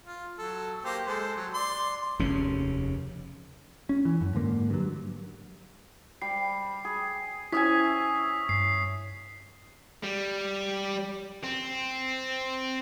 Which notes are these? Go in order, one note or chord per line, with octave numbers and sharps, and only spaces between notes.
F4
F#3 A4
A#3 G4 C5
G#3 A4 C5
F#3
D5 C6
F1 D#2 C#3 C#4
C#4
E3
F#2
G#2 D3 A#3
G2 F#3
G3 C7
G#4
C#4 E4 E5 G#5 D#6 B6
G2 C7
G3
C4